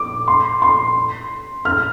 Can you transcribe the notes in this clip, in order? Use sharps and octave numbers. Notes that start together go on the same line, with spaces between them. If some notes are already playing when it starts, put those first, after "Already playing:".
Already playing: D6
C6
C6
F6